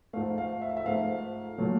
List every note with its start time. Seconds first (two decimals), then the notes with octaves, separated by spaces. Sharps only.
0.13 G#2 F3 A3 F5
0.38 F5
0.61 E5
0.69 F5
0.77 E5
0.85 G#2 F3 A3 F5
1.58 A#2 F#3 A3